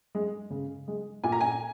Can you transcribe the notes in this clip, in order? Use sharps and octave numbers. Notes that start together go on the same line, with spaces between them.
G#3
C#3
G#3
A#2 G#5
A#5
G#5